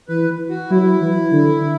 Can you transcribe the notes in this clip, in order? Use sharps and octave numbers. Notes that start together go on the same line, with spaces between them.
E3 B4
F#4
F#3 E4
E3
D3